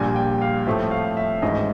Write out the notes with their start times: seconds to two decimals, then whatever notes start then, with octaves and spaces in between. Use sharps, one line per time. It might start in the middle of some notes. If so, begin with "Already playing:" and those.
Already playing: A#1 A#2 G3 G#5
0.16 G5
0.41 F5
0.67 A2 F3 A3 C4 E5
0.91 F5
1.17 E5
1.42 A1 G#2 D#3 D#5